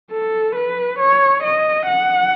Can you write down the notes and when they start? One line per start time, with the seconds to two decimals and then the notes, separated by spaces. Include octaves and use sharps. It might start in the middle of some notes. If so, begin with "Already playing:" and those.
0.11 A4
0.55 B4
0.99 C#5
1.43 D#5
1.87 F#5